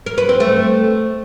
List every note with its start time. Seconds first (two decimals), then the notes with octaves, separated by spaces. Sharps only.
0.06 A#4
0.18 B4
0.29 C4
0.40 A3